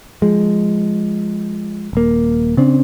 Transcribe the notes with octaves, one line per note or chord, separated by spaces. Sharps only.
F3 G#3
D#1 A#3
C#3 C4 D4